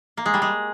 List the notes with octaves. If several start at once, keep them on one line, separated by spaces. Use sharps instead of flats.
A#3
G#3
G3
G#3